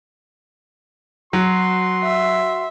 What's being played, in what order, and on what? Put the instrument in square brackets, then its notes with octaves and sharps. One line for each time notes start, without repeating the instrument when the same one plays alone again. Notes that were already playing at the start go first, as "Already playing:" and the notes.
[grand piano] F#3 [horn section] F#4 C6
[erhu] E5